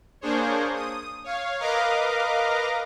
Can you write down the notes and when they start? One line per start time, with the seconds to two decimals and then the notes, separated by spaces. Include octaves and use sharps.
0.21 A#3 D4 G#4 C5 C#5
0.74 D#6
1.24 C#5 F5
1.60 A#4 B4 D#5 F5 A#5 D6